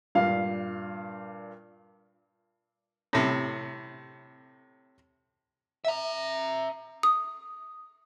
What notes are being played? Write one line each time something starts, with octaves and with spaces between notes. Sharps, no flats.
G2 A#2 F5
A2 C3
E5 A#5
D#6